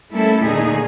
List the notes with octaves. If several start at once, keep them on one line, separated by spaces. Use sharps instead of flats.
G3 A3 A#3 C#4 E4 A4
D#2 A#2 D3 D#3 D#4 G#4